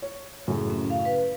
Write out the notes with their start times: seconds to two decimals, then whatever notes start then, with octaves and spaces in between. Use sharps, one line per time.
0.02 C#5
0.48 F#2 A2 C#3
0.70 C#4
0.90 F5
1.05 B4